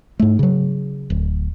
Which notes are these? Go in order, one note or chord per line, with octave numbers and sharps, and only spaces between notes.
G#2 A3
C#3 F#3
D1